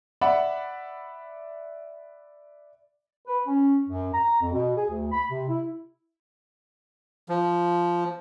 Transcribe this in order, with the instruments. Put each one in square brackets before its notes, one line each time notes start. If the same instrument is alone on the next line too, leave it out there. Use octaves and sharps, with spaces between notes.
[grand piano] D5 E5 F#5 B5
[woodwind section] B4
C#4
F#2
A#5
F2
B2
G#4
D2
B5
C3
E4
[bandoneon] F3